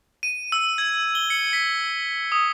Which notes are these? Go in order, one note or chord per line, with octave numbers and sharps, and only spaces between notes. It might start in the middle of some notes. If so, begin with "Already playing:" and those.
D#7
E6
G#6
G7
C#7
B6
D#6